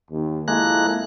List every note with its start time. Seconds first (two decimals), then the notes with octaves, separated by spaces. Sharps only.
0.11 D#2
0.48 F2 G#3 A#3 E4 A4 F#6